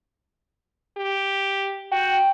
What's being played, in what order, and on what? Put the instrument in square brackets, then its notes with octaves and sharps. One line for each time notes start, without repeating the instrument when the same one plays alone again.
[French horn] G4
[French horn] F#4 [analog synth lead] G5